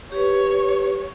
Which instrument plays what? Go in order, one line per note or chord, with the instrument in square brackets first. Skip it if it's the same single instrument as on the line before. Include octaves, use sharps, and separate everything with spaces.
[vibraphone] G4 B4 [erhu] C#5